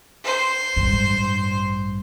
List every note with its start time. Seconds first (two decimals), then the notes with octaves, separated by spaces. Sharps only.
0.24 C5
0.76 A1 G2